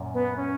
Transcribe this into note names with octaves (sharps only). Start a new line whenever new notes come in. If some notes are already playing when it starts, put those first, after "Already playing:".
Already playing: F#2 A#2
B3
C#4